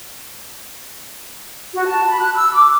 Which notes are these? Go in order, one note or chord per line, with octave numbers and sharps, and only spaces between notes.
F#4
A5
B5
F#6
E6
D6